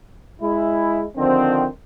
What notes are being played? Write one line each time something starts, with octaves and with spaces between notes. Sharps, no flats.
G#3 E4
D3 D#3 F3 C4